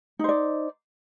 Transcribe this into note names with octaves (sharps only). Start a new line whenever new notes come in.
D#4 C5 D5